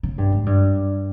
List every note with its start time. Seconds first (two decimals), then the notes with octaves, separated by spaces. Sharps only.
0.03 C#3
0.18 G2
0.32 G#2
0.46 G2